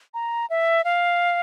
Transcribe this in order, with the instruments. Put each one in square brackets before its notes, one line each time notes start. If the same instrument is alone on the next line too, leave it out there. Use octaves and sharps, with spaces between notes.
[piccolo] A#5
E5
F5